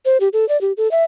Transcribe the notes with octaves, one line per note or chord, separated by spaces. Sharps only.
C5
G4
A4
D5
G4
A4
E5